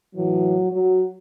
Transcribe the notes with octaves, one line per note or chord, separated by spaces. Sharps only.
A2 E3 F#3
F#3